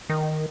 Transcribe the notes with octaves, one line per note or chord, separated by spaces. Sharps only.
D#3